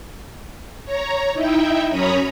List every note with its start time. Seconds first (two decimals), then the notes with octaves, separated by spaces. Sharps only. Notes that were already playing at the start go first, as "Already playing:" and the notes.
0.85 C#5 A#5
1.34 D#4 E4 E5 G5
1.90 F#2 C#4 C#5 A#5 B5 D#6